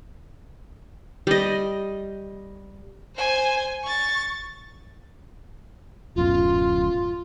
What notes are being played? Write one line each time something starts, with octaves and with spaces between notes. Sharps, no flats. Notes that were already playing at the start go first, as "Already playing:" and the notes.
G3 D#5
C5 G#5
C#6 A6
D1 F#2 B2 F4